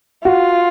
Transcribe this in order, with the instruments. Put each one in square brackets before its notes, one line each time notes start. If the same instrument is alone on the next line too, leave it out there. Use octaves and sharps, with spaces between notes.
[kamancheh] F4 [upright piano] F#4